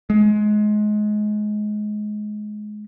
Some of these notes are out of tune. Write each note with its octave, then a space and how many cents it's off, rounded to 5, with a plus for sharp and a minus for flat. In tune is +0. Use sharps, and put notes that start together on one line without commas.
G#3 +20